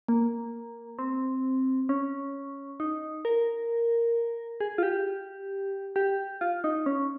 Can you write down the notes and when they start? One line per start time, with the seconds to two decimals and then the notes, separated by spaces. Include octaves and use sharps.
0.08 A#3
0.99 C4
1.89 C#4
2.80 D#4
3.25 A#4
4.60 G#4
4.78 F4
4.83 G4
5.96 G4
6.41 F4
6.64 D#4
6.86 C#4